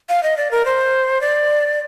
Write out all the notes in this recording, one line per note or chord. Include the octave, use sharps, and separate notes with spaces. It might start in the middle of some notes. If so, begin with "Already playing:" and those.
F5
D#5
D5
A#4
C5
D5